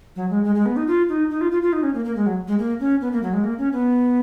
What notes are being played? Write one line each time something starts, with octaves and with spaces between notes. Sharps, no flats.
F#3
G#3
G#3
G#3
B3
D#4
F4
D#4
D#4
F4
F4
F4
D#4
C#4
A#3
A#3
G#3
F#3
G#3
A#3
C#4
B3
A#3
F#3
G#3
A#3
C#4
B3